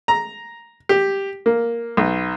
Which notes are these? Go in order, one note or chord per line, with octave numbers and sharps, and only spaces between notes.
A#5
G4
A#3
B1